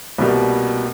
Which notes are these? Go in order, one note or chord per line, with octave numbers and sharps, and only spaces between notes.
C2 B2 G3 A#3